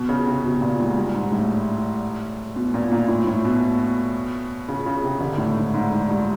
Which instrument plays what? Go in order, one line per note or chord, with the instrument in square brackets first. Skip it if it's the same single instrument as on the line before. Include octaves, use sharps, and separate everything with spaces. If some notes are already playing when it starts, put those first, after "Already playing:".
Already playing: [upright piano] B2
C#3
C3
B2
A#2
G#2
G2
G#2
A2
B2
A#2
A#2
A2
A2
B2
C#3
C#3
C3
D3
A2
G#2
G#2
G#2
G2